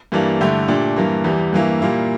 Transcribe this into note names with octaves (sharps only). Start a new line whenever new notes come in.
G2 E3 G3 A#3 D4
G2 D3 A3 E4 G4
A#2 A3 D4 G4
G2 E3 A#3
E2 E3 G3
G2 E3 A#3 E4
A#2 G3 A#3 E4